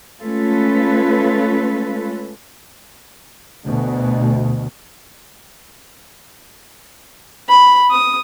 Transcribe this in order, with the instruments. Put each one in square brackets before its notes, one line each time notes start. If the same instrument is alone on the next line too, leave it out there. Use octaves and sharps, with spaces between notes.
[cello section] G#3 A3 C#4 F4 A4 B4
[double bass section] D2 B2
[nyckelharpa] B5
D#6